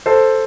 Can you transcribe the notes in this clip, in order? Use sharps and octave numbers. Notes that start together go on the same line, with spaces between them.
A4 C5